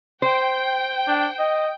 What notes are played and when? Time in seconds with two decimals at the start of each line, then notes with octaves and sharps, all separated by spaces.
0.22 C5 G5
1.08 D4
1.39 D#5